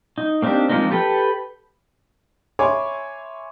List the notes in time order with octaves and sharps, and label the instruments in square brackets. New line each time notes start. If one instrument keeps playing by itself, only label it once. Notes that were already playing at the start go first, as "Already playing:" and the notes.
[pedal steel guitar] D#4
A#3 C4 D4 D#4 G4
F3 G#3 A#3 C4 D#4
G4 A4 B4 G5
[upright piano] C#5 E5 G#5 B5 C6 D6